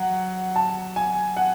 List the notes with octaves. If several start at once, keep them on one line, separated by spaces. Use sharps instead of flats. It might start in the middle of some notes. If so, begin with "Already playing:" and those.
Already playing: F#3 F#5
A5
G#5
F#5